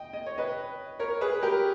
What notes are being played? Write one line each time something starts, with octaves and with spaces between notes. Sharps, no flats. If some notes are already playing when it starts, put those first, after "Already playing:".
Already playing: D#5 G5
D#5
C#5
B4 D#5
A#4 C#5
G#4 B4
G4 A#4